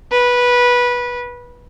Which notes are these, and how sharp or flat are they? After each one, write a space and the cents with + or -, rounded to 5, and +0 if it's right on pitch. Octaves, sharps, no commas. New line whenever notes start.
B4 -15